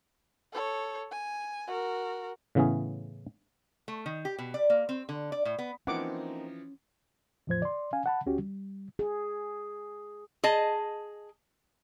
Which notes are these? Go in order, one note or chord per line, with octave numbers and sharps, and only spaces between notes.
A4 C#5
G#5
F#4 A#4
A2 C#3 E3 B3 C#4 G#4
A3
D#3
G4
B2
D5
A#3
C4
D3
D5
A2
B3
E3 F3 A#3 C4 C#4 D#4 F#5 D6
E2 A2 F3 F4 C5 G#6
D5 C6
C#4 F5 G#5
F#5 A5 B5
D2 C#4 F#4 G4
G3
G#4
G#4 D#5 A5